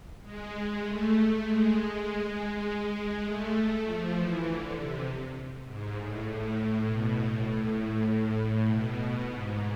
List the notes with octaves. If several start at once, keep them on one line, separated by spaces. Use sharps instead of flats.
G#3
A3
G#3
A3
F3
E3
D3
C3
G#2
A2
A2
B2
A2
A2
A2
B2
G#2